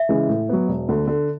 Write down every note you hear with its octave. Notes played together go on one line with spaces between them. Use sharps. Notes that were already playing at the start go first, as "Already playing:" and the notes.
Already playing: E5
C#3 E3 G#3
A2
F#3 B3
E1
D2 D3
D3